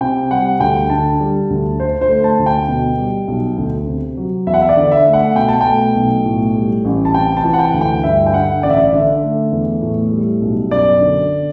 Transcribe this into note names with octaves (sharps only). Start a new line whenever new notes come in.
C3 G5
G3 F#5
D2 G5
D3 A5
G3
D2
D3 C5
C5
A3
A5
D2
G5
B2
G3
B1
D2
C3
F#3
E2 E5
F#5
E5
D5
D3
E5
A3
F#5
B2 G5
A5
G5
A3
B1
A2
G3
A1
A5
C3 G5
A5
E3
F#5
G5
D2
G5
G2 E5
G5
D3 F#5
A1 D5
E5
D5
D3 E5
A3
E2
A2
G3
B1
F#2 D5
D3